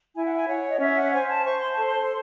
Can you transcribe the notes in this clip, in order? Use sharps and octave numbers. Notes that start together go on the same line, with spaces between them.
E4 G#5
F#5
G#5
C#5 F#5
D#5
C#4 E5
F#5
C5 G#5
A5
C5 C#6
C6
A5
A4
C6